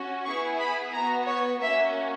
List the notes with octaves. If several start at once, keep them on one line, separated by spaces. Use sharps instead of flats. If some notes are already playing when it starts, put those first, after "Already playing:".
Already playing: C#4 F#4
B3 E4 G#4 C#6
B5
B3 F#4 A#5
C#5
A#3 C#4 F#4 E5